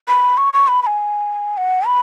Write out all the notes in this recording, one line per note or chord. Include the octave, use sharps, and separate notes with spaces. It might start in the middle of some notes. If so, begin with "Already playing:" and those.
B5
C#6
C#6
B5
B5
G#5
F#5
B5